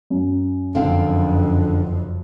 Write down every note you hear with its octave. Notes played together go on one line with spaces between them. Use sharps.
F#2
F#1 F2 D3 C4 F5